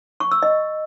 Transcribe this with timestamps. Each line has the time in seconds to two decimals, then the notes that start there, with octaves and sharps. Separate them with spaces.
0.20 C#6
0.31 E6
0.43 D#5